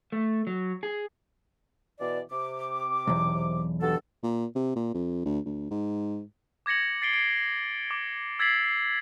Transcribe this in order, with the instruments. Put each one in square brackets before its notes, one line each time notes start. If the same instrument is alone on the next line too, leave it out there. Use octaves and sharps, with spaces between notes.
[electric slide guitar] A3
F#3
G#4
[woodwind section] B2 E3 D5
C3 D6
[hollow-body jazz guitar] B1 E2
[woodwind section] G2 F#4 A4
[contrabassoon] A#2
C3
A#2
F2
D2
D2
G#2
[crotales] D6 G#6 A#6 C#7 F#7
A6 C7 D7 G7
C7 D7
D6
E6 G#6 A6 B6 C7 F#7
C7